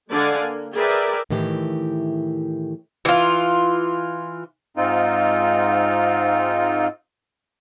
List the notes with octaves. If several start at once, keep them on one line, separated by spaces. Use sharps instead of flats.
D3 G#3 D5 F5 F#5 G#5
A#3
G#4 A#4 B4 D5 E5 G5
A2 D#3 E3 G4
E3 F4
G#2 C4 D#4 F4